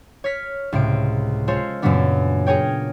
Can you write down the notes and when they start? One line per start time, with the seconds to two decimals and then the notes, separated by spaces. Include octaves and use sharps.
0.24 C#5 F6 B6
0.72 C#2 A2 C3 D7
1.48 G#3 F4 A4 C5 C#5
1.82 F#2 A#2 C#3 F#3 B3 D4
2.46 G#4 A#4 C#5 G5